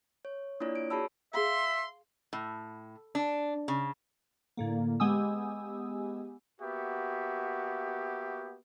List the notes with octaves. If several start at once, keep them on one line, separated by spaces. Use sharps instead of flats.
C#5
A#3 D4 E4 F4 C#5 D5
D7
F#4 G#4 C#5 A5 B5 E6
G#4 E5 F5 C6
A2
D4
C#3
A2 D3 A#3
G#3 B3 G4 G#5 D#6 E6
A#3 B3 F#4 G4 E5